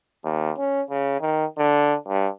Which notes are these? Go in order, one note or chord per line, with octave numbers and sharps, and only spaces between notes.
D#2
C#4
C#3
D#3
D3
G2